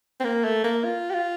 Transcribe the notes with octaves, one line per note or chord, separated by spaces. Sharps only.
C4
A#3
A3
A#3
F4
G4
F4